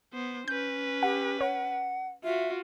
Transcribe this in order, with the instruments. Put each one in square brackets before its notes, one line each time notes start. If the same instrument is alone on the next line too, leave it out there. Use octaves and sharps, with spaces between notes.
[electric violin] B3 C5
[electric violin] C#4 B4 [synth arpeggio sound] G6
[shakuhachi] G4 [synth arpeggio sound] F#5
[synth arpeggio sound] C#5 [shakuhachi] F#5
[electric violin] F4 F#4 [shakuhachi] E5